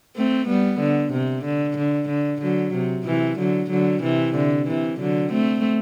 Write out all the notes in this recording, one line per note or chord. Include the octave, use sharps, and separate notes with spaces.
A3 C4
G3 B3
D3
C3
D3
D3
D3
D3 F#3
C3
C3 E3
D3 F#3
D3 F#3
C3 E3
D3
C3 E3
D3 F#3
A3 C4